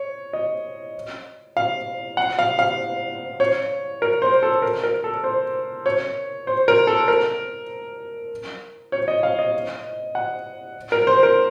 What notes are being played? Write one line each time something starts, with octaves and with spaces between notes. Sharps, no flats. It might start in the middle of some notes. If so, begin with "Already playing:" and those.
Already playing: C#5
D#5
F5
F#5
F5
F5
C#5
A#4
C5
A4
A#4
A#4
A4
C5
C#5
C5
A#4
A4
A#4
C#5
D#5
F5
D#5
F#5
A#4
C5
A#4